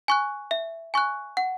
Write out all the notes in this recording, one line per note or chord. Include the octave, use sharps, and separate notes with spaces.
G#5 C#6 F#6
E5
G#5 C#6 F#6
F#5